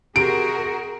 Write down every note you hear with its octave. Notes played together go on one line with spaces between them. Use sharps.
C3 F#4 G#4 A#4 D7